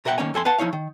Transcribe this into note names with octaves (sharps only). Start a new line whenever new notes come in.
B2 A#4 E5 F#5 G5
D#3 A#3 C#4 C#5 G#5
F2 A4 G#5 C6
B4 F5 F#5 A5
F3 D#4 E4 C#5 F5
D#3